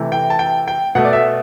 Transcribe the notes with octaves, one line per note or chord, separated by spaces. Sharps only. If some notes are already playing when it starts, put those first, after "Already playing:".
Already playing: C3 E3 A3
G5
A5
G5
G5
B2 A3 F#5
D5
E5